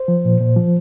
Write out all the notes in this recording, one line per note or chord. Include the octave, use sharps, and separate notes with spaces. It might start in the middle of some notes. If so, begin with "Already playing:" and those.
Already playing: C5
F3
A#2
A#2
F3